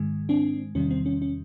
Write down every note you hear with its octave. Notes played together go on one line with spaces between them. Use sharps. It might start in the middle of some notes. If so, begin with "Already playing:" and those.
Already playing: G#2 D#3 G#3
C4 D4
E2 C3 D#3 G3 C#4
C4
C#4
C#4